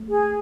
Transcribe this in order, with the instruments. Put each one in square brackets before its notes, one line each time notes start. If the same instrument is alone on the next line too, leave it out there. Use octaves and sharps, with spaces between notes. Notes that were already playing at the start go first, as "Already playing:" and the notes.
Already playing: [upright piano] A3
[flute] G#4